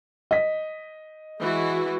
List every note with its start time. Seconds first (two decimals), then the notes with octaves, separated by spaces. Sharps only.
0.31 D#5 B6
1.41 E3 G#3 F#4